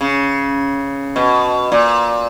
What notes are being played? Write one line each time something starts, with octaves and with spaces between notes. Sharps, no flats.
C#3
B2
A#2